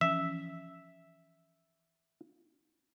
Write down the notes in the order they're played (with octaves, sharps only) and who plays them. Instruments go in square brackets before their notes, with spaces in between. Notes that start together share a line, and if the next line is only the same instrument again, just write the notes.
[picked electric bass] E3 F3 C#4 [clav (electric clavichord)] E5